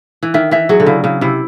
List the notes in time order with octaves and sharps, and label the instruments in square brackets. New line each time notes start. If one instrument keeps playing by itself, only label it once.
[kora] E3
[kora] D#3 [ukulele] E5
[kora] E3 [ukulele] E5
[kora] F#3 [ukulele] G#4
[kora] D3
[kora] C#3 [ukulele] E4
[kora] C#3 [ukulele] E4
[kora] C3 [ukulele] E4